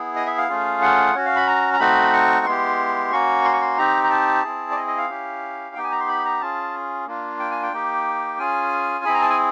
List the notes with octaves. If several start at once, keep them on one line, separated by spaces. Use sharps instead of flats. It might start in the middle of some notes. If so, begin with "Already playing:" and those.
Already playing: B3 E4 G#4
D#5
E5
F5
A3 C#4 F4 G#4
F#5
C#4 F#4 C#5
F5
B5
A#5
A#5
A3 C4 D#4 F#4 B5
C#6
G#3 B3 E4 G4 C6
A#3 C#4 F#4 C#6
C6
C#6
C6
C4 D#4 G4 A#5
A#5
A5
C4 E4 G#4
D5
D#5
D#5
F5
C#4 E4 G4
B3 D#4 G4 G5
G#5
A#5
C6
B5
A#5
C#4 F4 G#4 A5
A#3 D4 F4
G5
G#5
G5
A#3 D#4 G4
C#4 F4 G#4 G#5
C4 E4 G#4 B5
A#5
A5
G#5